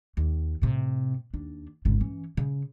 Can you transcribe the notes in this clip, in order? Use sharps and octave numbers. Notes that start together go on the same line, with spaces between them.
D#2
A2 C3
D#2 D4
G#1 C#3
E3 C#4
C#3